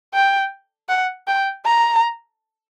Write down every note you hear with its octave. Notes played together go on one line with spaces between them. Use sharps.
G5
F#5
G5
A#5